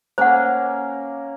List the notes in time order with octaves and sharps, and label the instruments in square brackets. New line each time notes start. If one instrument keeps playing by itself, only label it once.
[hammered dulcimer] A#3 C#4 [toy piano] C5 F#5